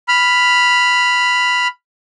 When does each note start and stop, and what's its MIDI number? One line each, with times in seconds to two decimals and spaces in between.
0.08 1.67 83
0.08 1.67 89